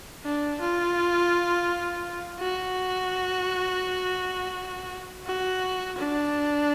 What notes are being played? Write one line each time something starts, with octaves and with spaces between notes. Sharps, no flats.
D4
F4
F#4
F#4
D4